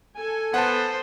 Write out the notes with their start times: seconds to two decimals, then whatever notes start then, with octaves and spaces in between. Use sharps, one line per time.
0.16 A4 G#5
0.54 B3 C5 F#5 A5